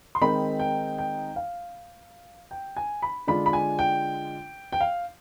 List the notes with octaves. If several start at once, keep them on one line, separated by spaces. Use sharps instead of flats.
C6
D#3 G#3 C4 D#4 B5
G5
G5
F5
G5
G#5
B5
D3 G#3 D4 F4 B5
B5
G#5
G5
G5
F5